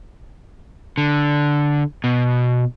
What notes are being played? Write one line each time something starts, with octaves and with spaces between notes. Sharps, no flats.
D3
B2